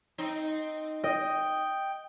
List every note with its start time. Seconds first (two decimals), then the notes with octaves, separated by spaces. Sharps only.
0.18 C4 D#4
1.04 D#5 G5